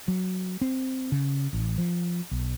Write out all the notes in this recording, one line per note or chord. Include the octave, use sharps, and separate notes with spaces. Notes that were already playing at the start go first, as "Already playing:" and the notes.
F#3
C4
C#3
A1
F3
B1